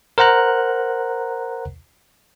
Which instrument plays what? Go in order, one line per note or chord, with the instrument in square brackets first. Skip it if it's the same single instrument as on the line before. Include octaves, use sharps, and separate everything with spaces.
[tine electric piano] A#4 C5 F#5 A#5 F#6